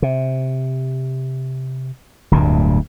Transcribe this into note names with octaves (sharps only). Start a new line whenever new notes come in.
C3
D1 D2 G2 A#2